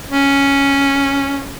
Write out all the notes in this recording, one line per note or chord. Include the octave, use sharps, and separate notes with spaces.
C#4